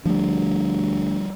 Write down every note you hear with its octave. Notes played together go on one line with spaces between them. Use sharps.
D2 F3 G3